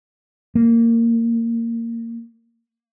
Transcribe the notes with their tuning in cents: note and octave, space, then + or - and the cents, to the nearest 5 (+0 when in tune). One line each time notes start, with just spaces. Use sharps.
A#3 -15